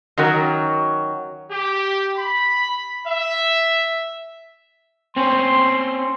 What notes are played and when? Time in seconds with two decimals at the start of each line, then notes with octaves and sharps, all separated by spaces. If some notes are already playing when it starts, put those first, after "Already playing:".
0.17 D#3 F#3 C#4 F#4 A#4
1.51 G4
2.17 B5
3.08 E5
5.16 C4 C#4 C6